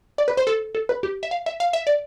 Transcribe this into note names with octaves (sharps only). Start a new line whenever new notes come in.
D5
B4
C5
A4
A4
B4
G4
E5
F5
E5
F5
E5
D5